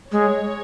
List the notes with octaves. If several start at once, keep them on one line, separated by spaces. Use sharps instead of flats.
G#3 C#5